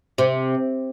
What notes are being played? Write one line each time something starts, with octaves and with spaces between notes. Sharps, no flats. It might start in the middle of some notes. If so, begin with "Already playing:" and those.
C3